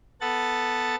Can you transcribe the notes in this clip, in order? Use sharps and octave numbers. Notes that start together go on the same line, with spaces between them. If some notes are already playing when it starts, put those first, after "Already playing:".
B3 A4 F#5 A6